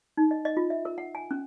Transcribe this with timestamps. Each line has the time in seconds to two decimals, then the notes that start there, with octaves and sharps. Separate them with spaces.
0.17 D#4
0.31 D#5
0.45 D#5
0.57 F4
0.70 E5
0.85 A#4
0.98 F#5
1.15 G#5
1.31 C#4